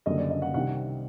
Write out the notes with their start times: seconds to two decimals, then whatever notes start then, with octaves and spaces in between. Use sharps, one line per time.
0.06 F#1 F#2 D3 G3 A#3 D#5
0.18 D5
0.30 D#5
0.42 F#5
0.54 C2 C3 D#3 G3 F#5